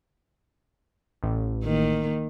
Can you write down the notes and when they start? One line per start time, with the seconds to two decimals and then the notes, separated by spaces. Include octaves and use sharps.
1.23 A1
1.64 D#3 A#3